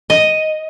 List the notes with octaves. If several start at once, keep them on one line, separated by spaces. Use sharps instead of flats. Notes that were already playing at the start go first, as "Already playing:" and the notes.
D#5